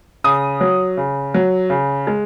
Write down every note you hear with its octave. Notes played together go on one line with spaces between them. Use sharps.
C#3 D#6
F#3
C#3
F#3
C#3
G#3